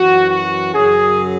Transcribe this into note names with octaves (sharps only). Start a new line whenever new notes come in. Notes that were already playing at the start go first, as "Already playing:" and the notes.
Already playing: F#2 E3 F#4
F#4
F#2 C#3 F#3 G#4